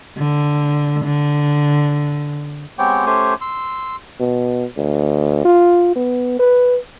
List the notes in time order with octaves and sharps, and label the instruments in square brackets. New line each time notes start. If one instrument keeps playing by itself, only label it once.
[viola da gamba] D3
D3
[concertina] G#3 B3 C4 G4 C#5 G5
A3 C#4 G4 C5 G#5
C6 E6
[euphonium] B2
D2
F4
B3
B4